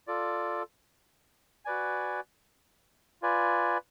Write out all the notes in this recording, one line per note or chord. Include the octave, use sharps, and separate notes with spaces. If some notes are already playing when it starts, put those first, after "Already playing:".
F4 A4 D5
F#4 B4 D5 G#5
F4 B4 D5 G#5